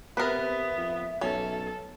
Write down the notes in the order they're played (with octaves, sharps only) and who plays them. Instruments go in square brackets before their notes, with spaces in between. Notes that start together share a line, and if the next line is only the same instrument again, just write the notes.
[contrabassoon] C3 [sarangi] B3 [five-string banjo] A#4 B4 [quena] E5
[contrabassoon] F2
[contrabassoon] B1 [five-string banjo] C#4 [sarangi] A4